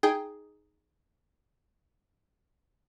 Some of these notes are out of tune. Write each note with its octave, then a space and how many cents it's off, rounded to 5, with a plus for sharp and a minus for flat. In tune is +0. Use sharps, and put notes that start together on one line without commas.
D#4 +0 G#4 +5 G5 +0